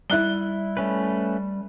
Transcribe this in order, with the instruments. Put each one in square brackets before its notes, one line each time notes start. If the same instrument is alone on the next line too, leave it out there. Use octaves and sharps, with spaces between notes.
[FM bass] G3 [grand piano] E4 F#6 G7
[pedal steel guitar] A3 C#4 B4